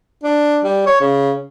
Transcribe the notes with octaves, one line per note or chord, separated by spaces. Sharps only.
D4
G3
C#5
C#3